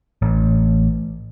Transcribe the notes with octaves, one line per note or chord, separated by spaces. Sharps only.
A1